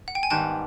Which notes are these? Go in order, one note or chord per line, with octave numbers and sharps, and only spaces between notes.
F#5
G5
G#5
G#2 D#3 G3 B3 G5 A5